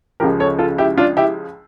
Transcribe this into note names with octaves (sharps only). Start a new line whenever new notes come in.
C#2 C#3 F3 G4 A#4
A4 C#5
F4 A4
E4 G4
D4 F4
E4 G4